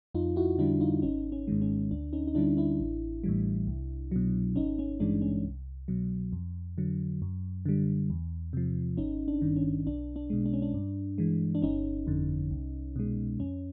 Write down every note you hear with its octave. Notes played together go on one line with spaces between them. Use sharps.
F2 D#4 F4
E4 F#4
D3 G3 D4 E4
D#4 F4
G#1 C#4 D#4
C#4
G#2 D#3 G#3
C#4
D2 D4
C#4 D#4
D#4
D3 G3 D4 E4
D4 E4
A1
A2 E3 G3
C2
B2 F#3
G#1 C#4 D#4
C#4
G2 E3 G#3 D4
C#4
C2
B2 F#3
F2
D3 F#3
F#2
D3 G3
E2
C3 F3
G#1 C#4 D#4
D4
G2 D#3
C#4
B1 D4
D4
B2 G#3
D4
C#4
D4
G2
E3 G#3
D4
G1 C#4 D#4
F2 D3
C2
B2 G#3
F2 C#4